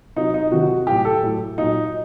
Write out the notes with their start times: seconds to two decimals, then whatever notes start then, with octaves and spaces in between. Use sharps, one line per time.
0.16 C3 F#3 D#4
0.34 D#4
0.51 C3 D#3 F#3 F#4
0.87 A2 F#3 G4
1.05 A4
1.22 A2 F#3
1.58 A#2 F#3 D#4